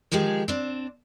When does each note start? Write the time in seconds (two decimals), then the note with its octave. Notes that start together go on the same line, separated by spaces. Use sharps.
0.12 D#3 F3 G#3 G4 G#4
0.48 C4 D4